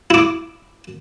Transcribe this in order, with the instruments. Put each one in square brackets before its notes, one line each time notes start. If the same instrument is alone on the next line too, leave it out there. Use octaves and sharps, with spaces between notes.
[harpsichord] E4 D6